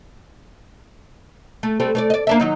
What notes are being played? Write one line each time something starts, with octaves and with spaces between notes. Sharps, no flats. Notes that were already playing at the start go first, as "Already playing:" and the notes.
A3
G3 A3 C4
A3 C#5 D5
D5 D#5
A#3 D4 E5
D#3 F#3 D#4